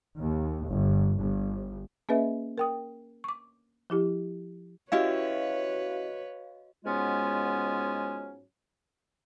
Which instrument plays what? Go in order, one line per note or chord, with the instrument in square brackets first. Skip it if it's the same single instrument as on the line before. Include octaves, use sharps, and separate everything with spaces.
[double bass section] D#2
G1
G1
[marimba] A#3 C#4 G#4 B4 D#5 E5
A#4 G5 D#6
C#6 D6
F3 E4 G4
[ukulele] C#4 E4 G4 [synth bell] F#4 D#5 F5 [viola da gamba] B4 C#5
[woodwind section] G#2 F#3 G#3 B3 C#4 F4